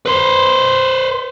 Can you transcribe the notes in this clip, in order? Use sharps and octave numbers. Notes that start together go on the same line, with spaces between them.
B4 C5